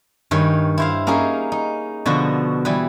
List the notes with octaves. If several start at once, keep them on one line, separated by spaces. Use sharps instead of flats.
G2 D#3 C#5 G#5 B5
E4 C5 F5
A#3 C#4 D#4 G#4
D#4
B2 D3 F3 F#4
E3 G3 G#4 B4